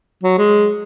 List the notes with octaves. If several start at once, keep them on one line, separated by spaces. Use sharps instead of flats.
F#3
G#3